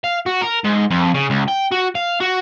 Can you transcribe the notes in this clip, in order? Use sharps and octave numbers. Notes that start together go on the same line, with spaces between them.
F5
F#4
A#4
G#2
F2
C#3
C#2
G5
F#4
F5
F#4